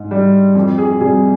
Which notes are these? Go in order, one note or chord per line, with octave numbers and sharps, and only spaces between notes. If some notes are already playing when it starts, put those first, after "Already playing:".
Already playing: G#2
G3
F2
G#4
C3 G3 G#4